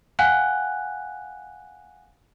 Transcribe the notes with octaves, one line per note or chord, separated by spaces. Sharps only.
F5 F#5 G#5 F#6